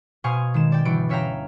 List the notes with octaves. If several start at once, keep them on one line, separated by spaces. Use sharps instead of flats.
B2 C5 F5 G#5 C#6 D#6
D#3 G#3 E7
D5 G5
G1 E3 F#4 D7
C#4 C#5 E5 F5 G5 A#5